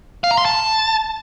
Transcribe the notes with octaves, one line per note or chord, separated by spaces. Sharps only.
F5
A#5
C6
A5